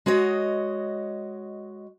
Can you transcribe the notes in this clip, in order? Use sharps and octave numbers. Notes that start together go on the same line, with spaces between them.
G#3 F#4 C#5 D#5